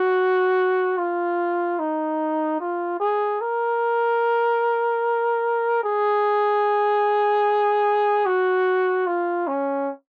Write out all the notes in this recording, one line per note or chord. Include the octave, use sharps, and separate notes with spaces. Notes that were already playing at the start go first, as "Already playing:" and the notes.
Already playing: F#4
F4
D#4
F4
G#4
A#4
G#4
F#4
F4
C#4